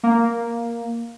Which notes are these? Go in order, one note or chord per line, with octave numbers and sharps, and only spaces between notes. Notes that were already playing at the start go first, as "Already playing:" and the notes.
A#3